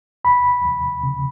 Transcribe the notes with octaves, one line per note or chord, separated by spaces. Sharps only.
D#2 B5
D#2
C#3